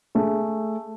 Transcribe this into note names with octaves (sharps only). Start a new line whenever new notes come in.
A3 G#4